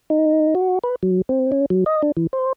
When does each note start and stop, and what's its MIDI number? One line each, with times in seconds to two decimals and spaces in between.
0.10 0.54 63
0.55 0.79 66
0.84 0.95 71
1.03 1.22 54
1.29 1.51 60
1.52 1.66 61
1.70 1.84 54
1.86 2.02 75
2.02 2.12 62
2.17 2.27 52
2.33 2.53 72